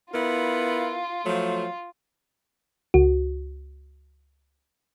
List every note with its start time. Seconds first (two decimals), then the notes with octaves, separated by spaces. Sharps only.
0.14 B3 E4 F4 A#4
1.26 F3 F#3 A3
2.94 C#2 F#4